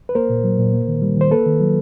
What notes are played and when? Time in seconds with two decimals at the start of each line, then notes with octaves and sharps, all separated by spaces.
0.09 B4
0.15 A#3 A#4 C5
0.30 A#2
0.44 F#3
0.59 A#2
0.73 A#3
0.88 D#3
1.02 G3
1.17 D#3 C5
1.31 A#3 A4 B4
1.46 D#3
1.60 F#3